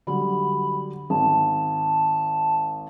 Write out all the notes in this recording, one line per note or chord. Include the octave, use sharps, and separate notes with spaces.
D3 F#3 G3 B5
G#1 A5